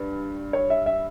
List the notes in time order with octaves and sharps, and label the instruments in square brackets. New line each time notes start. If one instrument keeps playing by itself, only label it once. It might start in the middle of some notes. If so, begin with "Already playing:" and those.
Already playing: [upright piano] G2 G3 [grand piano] B4
[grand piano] C#5
E5
E5